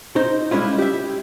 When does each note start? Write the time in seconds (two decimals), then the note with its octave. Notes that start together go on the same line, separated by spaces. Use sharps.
0.16 D#4 C5
0.51 G3 G#3 C#4 E4 F4
0.78 G4 E5